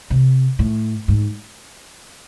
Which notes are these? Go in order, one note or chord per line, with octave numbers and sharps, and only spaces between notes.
C3
A2
G#2